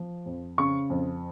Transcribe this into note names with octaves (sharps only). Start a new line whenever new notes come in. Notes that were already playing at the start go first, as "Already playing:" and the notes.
Already playing: F3
F2
C#3 C#6
F2